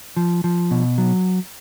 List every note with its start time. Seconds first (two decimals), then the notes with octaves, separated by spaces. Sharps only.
0.17 F3
0.44 F3
0.71 B2
0.98 F#3